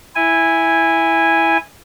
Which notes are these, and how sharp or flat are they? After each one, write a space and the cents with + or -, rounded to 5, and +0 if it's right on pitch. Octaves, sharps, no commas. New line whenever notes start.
E4 +0 G#5 -10